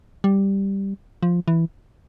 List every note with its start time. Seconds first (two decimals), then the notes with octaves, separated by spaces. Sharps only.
0.24 G3
1.23 F3
1.48 E3